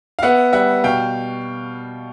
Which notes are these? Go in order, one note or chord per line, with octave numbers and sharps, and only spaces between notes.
F5
B3 E5 F#5
G3 E5 F#5
B2 F5 G5